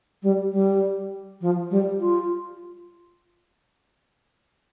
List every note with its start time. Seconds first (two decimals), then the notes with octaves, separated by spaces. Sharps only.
0.23 G3
0.52 G3
1.41 F3
1.71 G3
2.00 F4